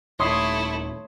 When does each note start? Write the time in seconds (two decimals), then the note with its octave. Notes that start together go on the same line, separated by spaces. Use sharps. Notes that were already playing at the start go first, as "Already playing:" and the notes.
0.20 D#1 A3 E4 C#5 C6 D#6